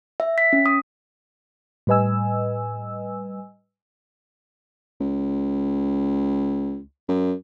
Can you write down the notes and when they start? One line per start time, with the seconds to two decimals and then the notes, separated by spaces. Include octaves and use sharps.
0.20 E5
0.38 B6
0.53 C#4
0.66 D#6
1.87 A2 G3 B4 D#5 G#5 E6
5.01 C#2
7.09 F#2